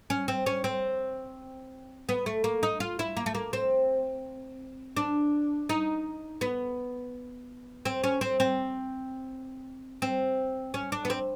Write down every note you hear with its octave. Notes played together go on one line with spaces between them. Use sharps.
C#4
C4
C#4
C4
B3
A3
A#3
D#4
F4
E4
A#3
A3
A#3
C4
D4
D#4
B3
C4
C#4
C4
C4
C4
C#4
D4
B3
C4